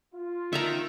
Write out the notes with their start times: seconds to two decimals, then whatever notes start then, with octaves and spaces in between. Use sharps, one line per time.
0.15 F4
0.53 D#3 E5 A5 A#5